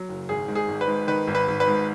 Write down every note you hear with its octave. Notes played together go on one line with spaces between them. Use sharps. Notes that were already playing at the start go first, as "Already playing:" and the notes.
Already playing: F#3
F#1
G#1 G#4
G#2
G#4
G#1
B4
G#2
D#3 B4
G#1
B4
G#1
B4
G#2